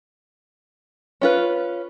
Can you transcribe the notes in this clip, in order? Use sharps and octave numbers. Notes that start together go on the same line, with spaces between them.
C#4 F4 B4